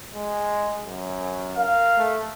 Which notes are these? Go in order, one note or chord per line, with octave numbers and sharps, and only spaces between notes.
G#3
F#2
A#4 F5
A3